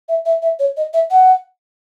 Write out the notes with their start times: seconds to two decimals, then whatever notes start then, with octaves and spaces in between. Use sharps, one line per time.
0.08 E5
0.25 E5
0.42 E5
0.59 C#5
0.77 D#5
0.93 E5
1.10 F#5